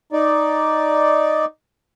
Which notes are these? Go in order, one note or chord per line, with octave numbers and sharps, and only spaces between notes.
D#4 D5